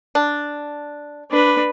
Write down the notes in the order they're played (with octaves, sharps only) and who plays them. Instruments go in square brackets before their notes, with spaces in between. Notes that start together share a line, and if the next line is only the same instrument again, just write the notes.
[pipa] D4
[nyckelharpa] D4 B4